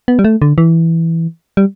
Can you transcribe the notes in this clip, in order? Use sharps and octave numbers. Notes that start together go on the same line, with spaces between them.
B3
G3
A3
D3
E3
G3